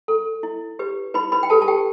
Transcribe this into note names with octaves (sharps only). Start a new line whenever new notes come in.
A4
E4
G4 B4
E4 B4 B5
B4 B5
G5
G4 A4 B4 A5
A5
G4 G5